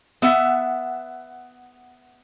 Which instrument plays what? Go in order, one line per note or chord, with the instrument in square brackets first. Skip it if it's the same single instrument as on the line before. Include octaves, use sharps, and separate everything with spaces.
[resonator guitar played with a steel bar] B3 E5 F#5